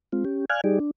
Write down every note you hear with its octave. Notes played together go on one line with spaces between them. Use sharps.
G#3 C4 F4
C#4 G4
D5 F5 G#5 F6 F#6 G#6
G3 D#4 G4 G#4 D5
D4